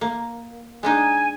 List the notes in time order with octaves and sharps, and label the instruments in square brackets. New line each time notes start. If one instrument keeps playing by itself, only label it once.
[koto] A#3
[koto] G#3 D4 D#4 [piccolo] G#5